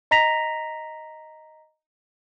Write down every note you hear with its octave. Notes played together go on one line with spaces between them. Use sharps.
D#5 A#5 A#6 B6 F7